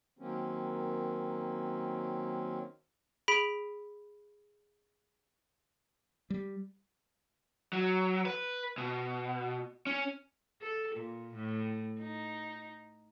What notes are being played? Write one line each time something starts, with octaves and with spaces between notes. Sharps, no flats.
D#3 F#3 A#3 C4 C#4
G#4 B5 B6 D7
G3
F#3
B4
B2
C#4
A4
A#2
A2
D#4